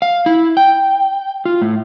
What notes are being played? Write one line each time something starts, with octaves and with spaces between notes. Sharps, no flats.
F5
E4
G5
F4
A2